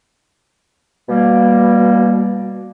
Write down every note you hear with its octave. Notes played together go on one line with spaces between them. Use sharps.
B2 G3 A#3